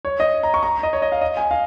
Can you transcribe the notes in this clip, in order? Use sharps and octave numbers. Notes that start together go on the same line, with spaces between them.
C#5
D#5
A#5
C#6
A#5
D#5
C#5
D#5
F5
D#5
G#5
F5